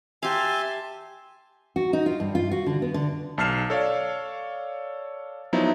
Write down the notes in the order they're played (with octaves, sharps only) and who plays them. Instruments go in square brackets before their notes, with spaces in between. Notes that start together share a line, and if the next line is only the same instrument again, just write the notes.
[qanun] G4 F5 [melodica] E5 G#5 [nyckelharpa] A5 C6
[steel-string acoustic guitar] F#4
D#4
F4
G2
F4
F#4
D3
B3
D3
[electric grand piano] B1 A5 F6 C7 E7
A4 C#5 D5 F5
F3 F#3 B3 D#4 E4